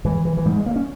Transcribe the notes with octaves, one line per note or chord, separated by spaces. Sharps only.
G#2 E3
E3
E3
G#2 G3
G#3
A#3
C#4